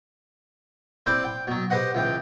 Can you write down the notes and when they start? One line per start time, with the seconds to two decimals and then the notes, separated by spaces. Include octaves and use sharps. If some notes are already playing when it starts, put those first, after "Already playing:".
1.06 C4 E4 G4 B4 C5 D5
1.24 G5
1.47 B2 F#3
1.70 G4 B4 C5 D#5 F#5
1.94 C#2 E3 G5